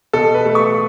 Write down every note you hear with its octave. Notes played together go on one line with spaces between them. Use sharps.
B2 A4
B4
A3
C#6